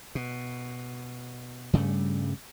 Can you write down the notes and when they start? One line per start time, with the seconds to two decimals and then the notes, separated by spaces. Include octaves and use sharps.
0.15 B2
1.73 G2 C#3 G3 A3